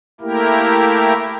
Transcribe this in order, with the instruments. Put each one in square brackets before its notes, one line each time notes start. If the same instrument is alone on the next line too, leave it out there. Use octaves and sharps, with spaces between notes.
[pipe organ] A3 A#3 E4 G4 A#4